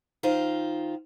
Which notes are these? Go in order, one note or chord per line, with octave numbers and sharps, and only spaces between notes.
D#3 F4 C5